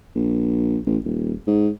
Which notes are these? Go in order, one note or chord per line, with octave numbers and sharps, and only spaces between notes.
A#1
A1
D#1
G#2